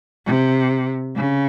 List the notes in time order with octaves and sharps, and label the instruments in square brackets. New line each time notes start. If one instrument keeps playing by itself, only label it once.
[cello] C3
C#3